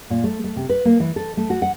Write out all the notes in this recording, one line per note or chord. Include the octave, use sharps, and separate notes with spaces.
A#2
A3
A3
C3
B4
A#3
E3
A4
A3
F#4
F#5